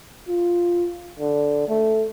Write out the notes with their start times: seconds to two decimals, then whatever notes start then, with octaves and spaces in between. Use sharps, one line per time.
0.28 F4
1.19 D3
1.68 A3